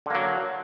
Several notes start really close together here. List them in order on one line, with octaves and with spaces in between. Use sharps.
D3 A#3 F#3